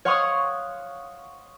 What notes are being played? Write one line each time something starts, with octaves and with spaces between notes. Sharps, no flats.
C#5 F5 F#5 C6 C#6 D#6